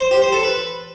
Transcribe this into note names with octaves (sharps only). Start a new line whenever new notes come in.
C5
G4
C5
A4
B4